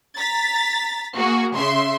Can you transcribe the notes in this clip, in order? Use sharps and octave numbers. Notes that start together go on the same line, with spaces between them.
A#5 A6 B6
A#3 F#4 G#4
C#3 E5 C6